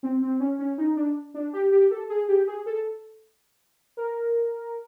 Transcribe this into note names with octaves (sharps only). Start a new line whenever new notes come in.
C4
C4
C#4
C#4
D#4
D4
D4
G4
G4
A4
G#4
G4
G#4
A4
A#4